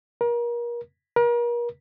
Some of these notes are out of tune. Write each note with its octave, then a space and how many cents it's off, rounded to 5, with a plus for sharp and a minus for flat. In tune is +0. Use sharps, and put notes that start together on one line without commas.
A#4 +35
A#4 +40